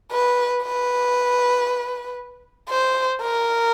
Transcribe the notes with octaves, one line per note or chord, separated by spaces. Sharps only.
B4
B4
C5
A#4